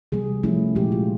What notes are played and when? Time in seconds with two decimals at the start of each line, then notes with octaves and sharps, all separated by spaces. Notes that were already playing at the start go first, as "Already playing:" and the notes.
0.12 C3 E3 G3 B3 G#4
0.43 F3 A3 C#4 E4
0.75 A#2 F3 G#3 G4
0.92 F4